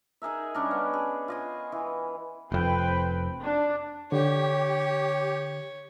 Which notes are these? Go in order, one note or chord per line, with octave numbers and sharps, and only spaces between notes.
D#4 G#4 A#4 E5
G3 C#4 D4 A#4
B3
G#4
F4 D#5 G#5
E3
F1 F2 C4 B4 G5
D4
D3 G4 C#5